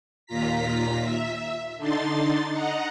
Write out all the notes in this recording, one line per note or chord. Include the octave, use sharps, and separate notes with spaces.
D#2 A#2 F4 A#5 B6
E5
D3 D4 D#4 C6 A6
D#5 F#5 A#5